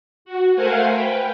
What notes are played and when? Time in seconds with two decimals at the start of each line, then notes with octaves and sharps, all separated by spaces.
0.25 F#4
0.55 A3 A#4 C5 F5 F#5 G#5
0.89 B4 G5